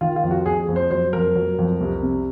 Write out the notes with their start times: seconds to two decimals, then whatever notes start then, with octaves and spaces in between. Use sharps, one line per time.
0.01 D#3 F4
0.16 F4
0.23 F2
0.31 F#4
0.46 F2 G#4
0.68 F2
0.76 C5
0.91 F#3 C5
1.13 F2 A#4
1.35 F#3
1.58 F2
1.81 C2
2.03 C3